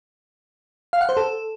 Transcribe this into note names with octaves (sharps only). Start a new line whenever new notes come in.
F5
F#5
C5
A4